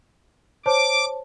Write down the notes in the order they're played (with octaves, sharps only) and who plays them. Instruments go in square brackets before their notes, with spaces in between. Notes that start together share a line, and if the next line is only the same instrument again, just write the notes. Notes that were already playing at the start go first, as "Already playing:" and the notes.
[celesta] C5 C#5 A5 [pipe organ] D6